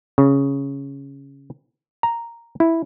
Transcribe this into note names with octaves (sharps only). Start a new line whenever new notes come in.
C#3
A#5
E4